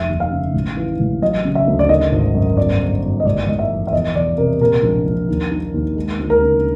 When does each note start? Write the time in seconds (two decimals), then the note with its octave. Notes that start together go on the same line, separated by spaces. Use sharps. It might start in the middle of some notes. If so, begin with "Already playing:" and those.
Already playing: F1 E5
0.09 D#2
0.20 F5
0.31 C#3
0.54 A1
0.77 E3
1.00 A1
1.22 F#3 D#5
1.45 C#3
1.55 E5
1.68 D2
1.79 D5
1.89 D#3 D#5
2.12 G#1
2.35 F#2
2.57 G1 D5
2.80 G1
3.03 G1
3.20 D#5
3.25 A1 D5
3.47 A1 D#5
3.59 E5
3.70 F3
3.87 E5
3.93 E2 D#5
4.15 E2 D5
4.38 C3 A#4
4.60 A#2 A#4
4.83 A#1
5.06 A#1
5.29 D#2
5.52 D#3
5.74 D#2
5.96 G#3
6.19 D2
6.30 A#4
6.42 C#3